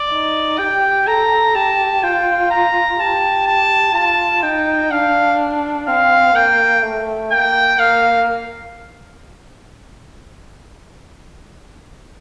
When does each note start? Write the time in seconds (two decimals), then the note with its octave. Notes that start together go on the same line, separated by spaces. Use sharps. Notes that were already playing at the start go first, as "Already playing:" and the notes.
Already playing: D5
0.11 D#4
0.58 G4 G5
1.07 A4 A#5
1.55 G4 A5
2.03 F4 G5
2.50 A#5
2.99 G4 A5
3.47 A5
3.95 F4 A5
4.43 D#4 G5
4.91 D4 F5
5.88 C4 F5
6.35 A#3 G5
6.83 A3
7.31 A#3 G5
7.79 A#3 F5